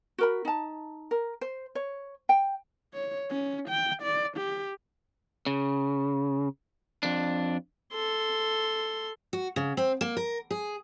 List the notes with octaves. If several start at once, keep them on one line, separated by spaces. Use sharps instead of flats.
F#4 A#4 B5
D#4 A5
A#4
C5
C#5
G5
C#5
C#4
G5
D5
G4
C#3
F2 D4
A4 C6
F#4
C#3
C4
A#3
A#4
G#4